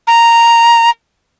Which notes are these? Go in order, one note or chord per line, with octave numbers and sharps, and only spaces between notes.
A#5